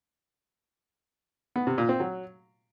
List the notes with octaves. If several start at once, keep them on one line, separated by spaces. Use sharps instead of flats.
B3
C3
A#2
C4
F#3